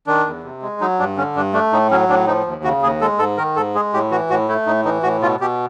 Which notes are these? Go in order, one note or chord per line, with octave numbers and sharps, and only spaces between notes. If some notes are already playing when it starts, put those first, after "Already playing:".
D#3 D4
E2
C3
G#3
F#3 D#4
G2 D4
D3 C#4
G2 D4
A3 D4
A2 D#4
F#3 C#4
A2 D4
F3 D#4
D#2
C#3 F#4
D#2 G#4
G#3 A4
G#2 A4
D#3 A#4
G#2 A4
G#3 G#4
A2 G4
E3 F#4
A2 F#4
A3 E4
A2 D#4
E3 D#4
A2 F#4
B2 F4
B2 G4